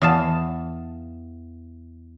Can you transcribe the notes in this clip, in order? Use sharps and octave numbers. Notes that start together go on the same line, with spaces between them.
E2 D#5 F5 A5